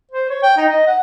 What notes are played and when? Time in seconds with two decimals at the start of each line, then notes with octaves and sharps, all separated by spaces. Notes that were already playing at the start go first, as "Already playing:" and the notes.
0.11 C5
0.29 C#5
0.42 G5
0.57 D#4
0.69 D#5
0.87 F#5